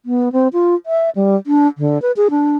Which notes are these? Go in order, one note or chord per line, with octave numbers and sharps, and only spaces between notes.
B3
C4
F4
E5
G3
D4
D3
B4
G#4
D4